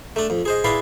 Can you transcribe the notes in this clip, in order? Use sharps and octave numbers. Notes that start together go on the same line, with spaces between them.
A3 D4
F2
G#4 C5 D#5
E4 G#4 B4 D5 F5 C6